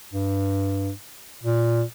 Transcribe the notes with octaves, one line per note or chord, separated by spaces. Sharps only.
G2
A#2